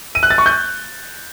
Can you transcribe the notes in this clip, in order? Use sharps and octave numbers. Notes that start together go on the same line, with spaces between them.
D#7
F#6
A6
C#6
G6